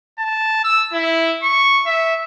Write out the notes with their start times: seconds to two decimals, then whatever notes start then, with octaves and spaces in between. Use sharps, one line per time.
0.19 A5
0.64 E6
0.93 E4
1.43 C#6
1.86 E5